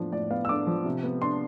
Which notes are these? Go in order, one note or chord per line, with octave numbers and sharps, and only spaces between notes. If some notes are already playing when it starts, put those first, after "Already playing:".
Already playing: A2 F3 B3 D4
A2 D5
B3 F5
E6
D4 D6
F3
C3
B3
D4 C6